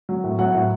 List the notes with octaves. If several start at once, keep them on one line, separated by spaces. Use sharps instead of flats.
F#3
A2
F#3 F#5
A2